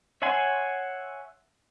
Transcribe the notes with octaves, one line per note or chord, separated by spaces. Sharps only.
C#5 E5 F#5 G#5 C6